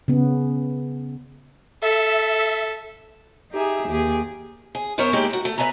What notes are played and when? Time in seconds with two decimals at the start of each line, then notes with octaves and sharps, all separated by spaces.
0.08 C#3 B3
1.82 A4 E5
3.51 D#4 G4 G#4 E5
3.89 D#2 G4 G#4
4.75 G#4
4.98 F#2 B3 A#4 C5 C#5
5.13 G#3 A#3 D#4 E4 G4
5.31 F#4 A#4
5.45 A3
5.58 B4 D5 E5 G#5 A#5